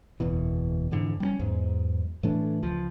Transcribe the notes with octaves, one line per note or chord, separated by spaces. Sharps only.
F#1 E2 B2 E3
F2 G#2 D3 E3
G3 B3 C#4
E2 G#2 F#3
A2 E3 A3 D4
C#2 F3